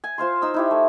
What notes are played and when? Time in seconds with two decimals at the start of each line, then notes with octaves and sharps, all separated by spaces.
0.04 G#5
0.18 F4 C5 F5 C6
0.42 D#4 E6
0.54 D#4 E4 G4
0.71 A3